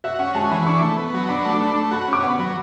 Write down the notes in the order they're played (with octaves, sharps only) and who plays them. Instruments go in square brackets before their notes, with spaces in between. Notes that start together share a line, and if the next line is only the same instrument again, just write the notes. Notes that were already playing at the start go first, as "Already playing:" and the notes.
[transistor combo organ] F#4 [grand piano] E5
[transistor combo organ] C#4 [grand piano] F#5
[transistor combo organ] G#3 [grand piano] A5
[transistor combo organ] E3 [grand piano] B5
[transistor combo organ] D4 [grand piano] C#6
[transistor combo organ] A3
B3
F#3
[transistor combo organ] D4 [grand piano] B5
[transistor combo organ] A3
D4
A3
[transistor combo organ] F#4 [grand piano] B5
[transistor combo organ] C#4 [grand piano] D6
[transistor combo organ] B3 [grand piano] F#5
[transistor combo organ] F#3